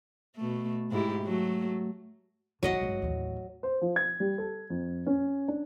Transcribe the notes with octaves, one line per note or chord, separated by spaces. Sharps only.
B2 A3
G#2 E4 G4
F#3 A3
G1 D#3 F#3 D#5 F#5
G#1 G2
A1 D#2
C5
F3
G#6
G3
A4
F2
C#4
D4